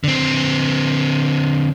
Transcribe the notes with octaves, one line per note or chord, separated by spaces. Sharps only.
D3 C4